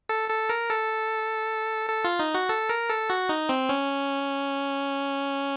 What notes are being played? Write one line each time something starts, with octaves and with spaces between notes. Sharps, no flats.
A4
A4
A#4
A4
A4
F4
D#4
F#4
A4
A#4
A4
F#4
D#4
C4
C#4